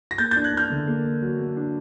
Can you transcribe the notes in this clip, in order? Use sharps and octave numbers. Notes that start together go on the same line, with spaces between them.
A#6
A#3 G6 A6
G6 A6
D4
F#6 G#6
D4 F6 G6
D3
A#3
A#3
F#3
A#3
D4